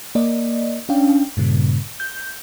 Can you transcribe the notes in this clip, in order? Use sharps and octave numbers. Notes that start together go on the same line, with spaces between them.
A#3 D5 D#5
C#4 D4 F5 G5
G2 A#2 C#3
G6